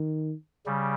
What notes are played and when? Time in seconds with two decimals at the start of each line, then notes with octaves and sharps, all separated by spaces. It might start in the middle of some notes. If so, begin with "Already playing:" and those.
Already playing: D#3
0.66 C#3 G3